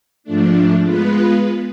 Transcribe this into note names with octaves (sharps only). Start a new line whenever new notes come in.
G#2 F3 A3 D4
G#3 B3 F4 B4